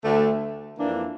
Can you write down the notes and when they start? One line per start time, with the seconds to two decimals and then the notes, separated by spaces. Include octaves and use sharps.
0.04 D2 D3 A3
0.78 F2 E3 A#3 D4